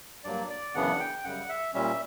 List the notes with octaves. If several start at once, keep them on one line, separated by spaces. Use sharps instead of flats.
G2 F#3 A#3 D5
D5
F#2 C#3 E3 B3 D4 F#5
G5
F#2 C#3 G3 F#5
E5
A#2 G3 C#4 E5